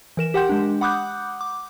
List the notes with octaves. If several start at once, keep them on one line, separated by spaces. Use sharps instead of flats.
E3 A#4 E7
G4 A#4 F#5 G5 C6 G6
G#3 D4
F#5 B5 D6 D#6 F#6 G6
D6